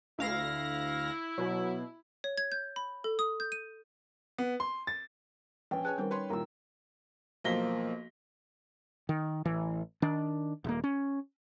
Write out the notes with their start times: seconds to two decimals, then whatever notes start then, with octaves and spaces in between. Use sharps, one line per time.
0.19 D2 E4 F5 A#6
1.38 B2 F#3
2.24 C#5
2.38 G#6
2.52 G6
2.76 B5
3.04 A4
3.19 D#6
3.40 G6
3.52 D#7
4.38 B3
4.60 C6
4.87 A6
5.71 A#1 C#4 B4 G5
5.85 G#4 B4 C#5 G#5 A5 F#6
5.98 D#3 G3 C4 D#4 A#4
6.11 B4 C#5 C6
6.30 C2 A#2 D#3 A#4 E6
7.44 B1 F3 A#3 A#6 B6 G7
9.09 D#3
9.45 A1 E3
10.02 D#3 D4
10.64 D#1 A#3
10.84 C#4